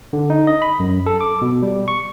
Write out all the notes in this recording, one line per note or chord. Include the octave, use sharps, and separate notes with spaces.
D3
D#4
D#5
B5
F#2
A4
D6
B2
G3
C#6